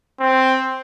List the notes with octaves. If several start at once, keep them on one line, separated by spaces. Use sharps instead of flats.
C4